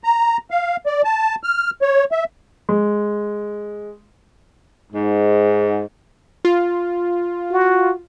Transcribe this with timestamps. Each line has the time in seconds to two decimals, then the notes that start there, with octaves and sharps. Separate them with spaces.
0.04 A#5
0.51 F5
0.86 D5
1.04 A5
1.43 F6
1.82 C#5
2.12 E5
2.69 G#3
4.93 G#2
6.45 F4
7.51 F#4